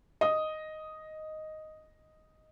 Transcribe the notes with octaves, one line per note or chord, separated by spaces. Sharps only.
D#5 D#6